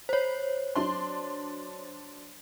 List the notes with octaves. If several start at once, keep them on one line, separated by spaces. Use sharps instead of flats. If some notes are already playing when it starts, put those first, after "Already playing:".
C5 C#5
F#3 D4 C6